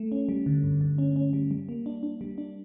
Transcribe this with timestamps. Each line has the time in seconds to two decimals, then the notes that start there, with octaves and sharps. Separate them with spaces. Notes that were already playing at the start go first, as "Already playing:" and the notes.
Already playing: A3
0.12 C#4
0.29 G3
0.46 D3
0.64 G2
0.81 D3
0.98 C#4
1.16 C#4
1.33 G3
1.51 G3
1.69 A#3
1.86 D4
2.03 D4
2.21 G3
2.38 D4